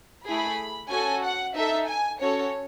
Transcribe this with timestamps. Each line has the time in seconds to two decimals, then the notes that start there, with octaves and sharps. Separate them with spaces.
0.26 A3 E4 G#4 B5
0.90 C#4 F#4 A4 G#5
1.24 F#5
1.55 D#4 A4 E5
1.87 G#5
2.20 C#4 F#4 A4 C#5